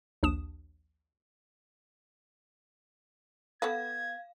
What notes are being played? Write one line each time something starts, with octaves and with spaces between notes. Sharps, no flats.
A#1 D#2 D4 D#6 E7
B3 A4 B4 F5 G#6